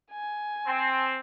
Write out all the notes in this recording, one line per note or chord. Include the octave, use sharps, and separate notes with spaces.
G#5
C4